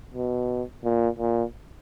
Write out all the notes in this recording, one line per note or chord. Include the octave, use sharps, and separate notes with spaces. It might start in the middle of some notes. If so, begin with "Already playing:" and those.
B2
A#2
A#2